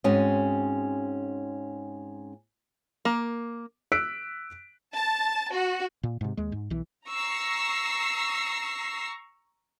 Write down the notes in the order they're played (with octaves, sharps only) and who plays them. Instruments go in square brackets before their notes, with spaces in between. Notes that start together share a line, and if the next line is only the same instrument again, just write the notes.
[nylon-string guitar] G#2 C4 C#4 F#4 D#5
[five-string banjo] A#3
[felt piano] E6 F#6 B6 D7
[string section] A5
F#4
[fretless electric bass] A#2
G#2 C3
D#2 G#3
G#2
B1 E3
[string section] A#5 C#6 E6 A#6 C7